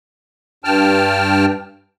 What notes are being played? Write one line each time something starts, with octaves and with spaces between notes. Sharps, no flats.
G2 G5 A5 F6